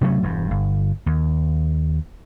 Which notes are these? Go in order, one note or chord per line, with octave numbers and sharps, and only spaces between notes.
C3 F#3 A3 C#4
E1 G2
G1
D#2